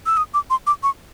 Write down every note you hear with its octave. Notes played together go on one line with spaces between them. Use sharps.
E6
D#6
D6
C6
D6
C#6